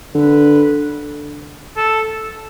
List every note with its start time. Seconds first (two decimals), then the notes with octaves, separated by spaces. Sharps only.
0.15 D3 B4
1.77 A4